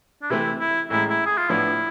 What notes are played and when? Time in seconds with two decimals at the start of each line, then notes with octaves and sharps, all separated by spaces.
0.22 D4
0.30 C3 E3 A3 C4 E4
0.60 E4
0.90 A1 A2 G#3 E4
1.10 E4
1.26 G#4
1.37 F4
1.49 A2 F3 B3 D4 E4 F4